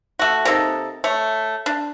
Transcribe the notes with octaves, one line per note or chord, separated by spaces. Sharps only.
A3 F#4
C3 A#3 D#4 A4
A3 C#5
D4